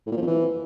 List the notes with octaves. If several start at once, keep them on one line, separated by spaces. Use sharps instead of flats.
A2
A#2
F3
F2
E3